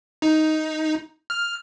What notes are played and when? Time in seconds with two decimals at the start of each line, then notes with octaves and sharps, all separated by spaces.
0.22 D#4
1.30 F6